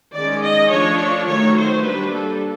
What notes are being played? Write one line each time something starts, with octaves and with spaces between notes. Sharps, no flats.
D#3 G#3 C#4 D5
D#5
F3 A3 D4 C#5
D#3 F#3 A3 C#5
C5
G3 A#3 D4 B4
A4